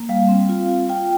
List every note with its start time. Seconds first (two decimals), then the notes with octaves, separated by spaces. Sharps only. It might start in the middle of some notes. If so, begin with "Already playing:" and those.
Already playing: A#3
0.09 G3 F5
0.29 C4
0.49 F4
0.69 F4
0.89 F4 G5